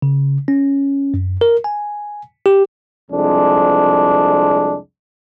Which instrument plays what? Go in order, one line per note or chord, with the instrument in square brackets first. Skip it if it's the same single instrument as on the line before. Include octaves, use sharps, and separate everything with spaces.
[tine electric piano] C#3
C#4
F#2
A#4
G#5
G4
[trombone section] C2 F2 G#3 D4